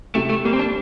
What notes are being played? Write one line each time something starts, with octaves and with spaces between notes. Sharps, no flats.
C3 A3
A3
G3 A#3
C4
D4